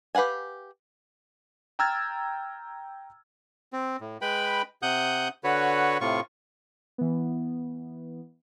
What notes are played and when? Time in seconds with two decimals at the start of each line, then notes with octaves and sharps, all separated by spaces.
0.15 G4 B4 F5 F#5 G#5
1.79 G5 A#5 E6 F6 G#6 A6
3.73 C4
4.01 A2
4.21 G#3 B4 G5 B5
4.82 C3 F#5 D#6 F#6 G6
5.44 D3 F#4 B4 C#5
6.01 A2 C3 F4 C#6
6.98 E3 B3